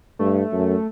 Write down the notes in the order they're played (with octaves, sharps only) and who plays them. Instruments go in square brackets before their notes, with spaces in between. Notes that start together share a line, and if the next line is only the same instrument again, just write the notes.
[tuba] G2 [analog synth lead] A3
[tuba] F#2